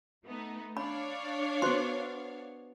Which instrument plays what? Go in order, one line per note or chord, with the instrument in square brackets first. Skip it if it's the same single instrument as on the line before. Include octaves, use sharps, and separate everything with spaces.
[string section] A3 B3 D#4
[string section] D4 C#5 F5 [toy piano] B5
[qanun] B3 F#4 [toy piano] C5 C6